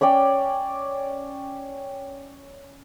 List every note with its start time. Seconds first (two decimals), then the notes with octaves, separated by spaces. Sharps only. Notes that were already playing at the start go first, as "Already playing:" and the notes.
0.01 C#4 C#5 D5 G5